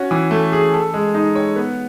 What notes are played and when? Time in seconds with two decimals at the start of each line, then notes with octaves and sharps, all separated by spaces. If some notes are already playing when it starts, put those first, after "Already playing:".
Already playing: C#4 F#4
0.11 E3
0.31 A3
0.52 G#4
0.74 A4
0.94 G#3
1.14 D#4
1.35 C#5
1.56 B3